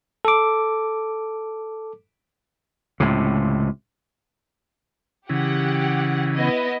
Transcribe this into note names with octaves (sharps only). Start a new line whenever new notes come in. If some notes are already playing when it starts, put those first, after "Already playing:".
A4 D6
C#2 A2 C3
C#3 E3 G4 F#5
B3 E4 D#5